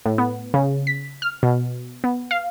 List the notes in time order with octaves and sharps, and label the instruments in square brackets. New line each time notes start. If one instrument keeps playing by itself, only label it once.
[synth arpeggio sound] A2
B3
C#3
B6
F6
B2
B3
F5